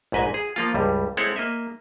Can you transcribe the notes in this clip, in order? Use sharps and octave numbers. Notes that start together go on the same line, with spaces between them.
A#1 G#2 B4 D#5 G#5
G#4
F3 A#3 F4
C#2 G2 G3
G#3 C4 E4 A4 C#5 F#5
A#3 D#5 E5